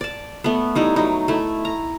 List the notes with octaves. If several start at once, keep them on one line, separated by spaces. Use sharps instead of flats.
D5 A5
A3 B3
G3 D#4 E4
F#3 D#4
A3 E4
A#5